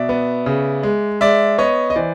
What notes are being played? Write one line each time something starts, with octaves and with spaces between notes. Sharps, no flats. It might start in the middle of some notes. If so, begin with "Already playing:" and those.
Already playing: B2 D5 E5
B3
C#3
G#3
G#3 D5 E5
B3 C#5 D#5
D#5
E3 C5 D5